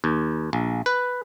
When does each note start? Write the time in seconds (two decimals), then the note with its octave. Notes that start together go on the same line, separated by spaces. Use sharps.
0.04 D#2
0.53 A#1
0.86 B4